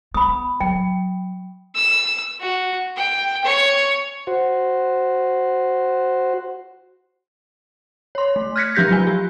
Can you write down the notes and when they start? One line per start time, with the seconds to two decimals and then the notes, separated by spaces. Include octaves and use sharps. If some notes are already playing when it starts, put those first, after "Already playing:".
0.14 B3 B5 D#6
0.60 F#3 G5
1.75 E6
2.40 F#4
2.96 G5
3.45 C#5
4.27 F#4 C5
8.15 C#5 C6
8.36 A3
8.56 F6 F#6 G#6 A#6 B6 C#7
8.75 F3 C#4 G4 G6 A#6 B6
8.91 F#3 F4 G#5
9.07 G4